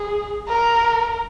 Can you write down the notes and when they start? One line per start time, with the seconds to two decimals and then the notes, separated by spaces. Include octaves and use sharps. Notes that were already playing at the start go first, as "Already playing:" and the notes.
Already playing: G#4
0.48 A#4